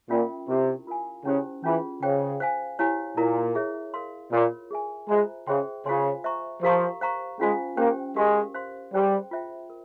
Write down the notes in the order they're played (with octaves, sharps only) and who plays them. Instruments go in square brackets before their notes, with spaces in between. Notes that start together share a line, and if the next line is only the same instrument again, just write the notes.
[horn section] A#2 [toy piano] C#4 F4 A#4 E5 G5
[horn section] C3 [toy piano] E4 G4 A#4
[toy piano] F4 A#4 F5 G#5
[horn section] C#3 [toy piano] C#4 E4 G4 C5
[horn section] E3 [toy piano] C#4 F4 G#4
[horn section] C#3 [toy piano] G#4 C5 G5
[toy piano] C5 F5 G#5
E4 G4 C#5 F5 G#5
[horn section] A#2 [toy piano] E4 A#4 F5 A#5
[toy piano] G#4 C#5 E5
A#4 F5 C6
[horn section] A#2 [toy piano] F4 A#4 C#5
[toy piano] G#4 E5 G#5
[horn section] G#3 [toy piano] F4 C5 E5 A#5
[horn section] C#3 [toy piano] G#4 C5 E5 G5 C6
[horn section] C#3 [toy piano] F4 C5 F5 G#5 C6
[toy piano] C5 E5 A#5 C#6
[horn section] F3 [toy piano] G4 A#4 F5 A#5 C#6
[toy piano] C5 F5 A#5 C#6
[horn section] G#3 [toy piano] C#4 F4 C5 F5 G#5
[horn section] A#3 [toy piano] C#4 G4 C5 G5
[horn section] G#3 [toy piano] G4 A#4 F5
[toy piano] C5 F5 C6
[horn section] G3 [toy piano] G#4 C5 G5 C6
[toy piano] F4 C5 E5 G5
A#4